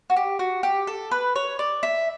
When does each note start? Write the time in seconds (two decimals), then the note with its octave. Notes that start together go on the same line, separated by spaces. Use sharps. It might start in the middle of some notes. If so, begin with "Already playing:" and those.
0.10 F#4
0.16 G4
0.39 F#4
0.63 G4
0.87 A4
1.11 B4
1.36 C#5
1.59 D5
1.83 E5